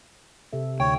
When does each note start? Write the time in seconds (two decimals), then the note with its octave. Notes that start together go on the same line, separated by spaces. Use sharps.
0.53 C3 A4 E5
0.80 D2 C#5 G5